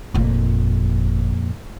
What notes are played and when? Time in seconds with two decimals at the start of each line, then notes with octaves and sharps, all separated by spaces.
0.14 G1 F2 A#2